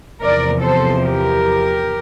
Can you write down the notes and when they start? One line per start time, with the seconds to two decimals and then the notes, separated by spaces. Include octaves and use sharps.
0.22 E2 C3 F3 A#4 D5
0.62 A4 C5
1.02 G4 A#4